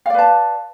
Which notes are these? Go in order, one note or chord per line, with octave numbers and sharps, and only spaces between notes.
B4 D5 F5 A5